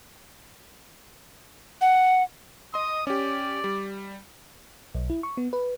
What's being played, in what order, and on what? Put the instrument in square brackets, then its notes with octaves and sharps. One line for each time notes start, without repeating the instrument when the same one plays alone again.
[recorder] F#5
[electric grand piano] D#5 C6 [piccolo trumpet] D#6
[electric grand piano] C#4 G4 [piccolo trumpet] D5
[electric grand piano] G3
[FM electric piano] B1
E4
C#6
B3
B4